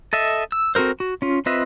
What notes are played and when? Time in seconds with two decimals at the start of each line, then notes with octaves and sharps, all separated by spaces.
0.13 A4 D#5 E5
0.52 E6
0.75 C4 F#4 A4 A#4 C5
1.00 F#4
1.22 C#4 F4
1.46 C4 F4 B4 D#5 E5